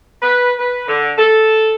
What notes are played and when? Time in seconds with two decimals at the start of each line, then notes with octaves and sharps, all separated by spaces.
0.22 B4
0.58 B4
0.88 D3
1.18 A4